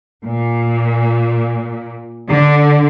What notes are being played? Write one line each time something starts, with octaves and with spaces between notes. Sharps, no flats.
A#2
D3